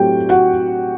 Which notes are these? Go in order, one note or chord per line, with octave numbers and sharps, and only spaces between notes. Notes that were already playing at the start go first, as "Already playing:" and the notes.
Already playing: A2 F#3 A3 C4 F#4 G4 G5
F#4 F#5